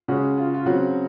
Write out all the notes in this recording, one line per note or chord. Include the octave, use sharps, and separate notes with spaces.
C#3 G#3 C#4 F#4
F4
F4
C#3 F#3 C4 F#4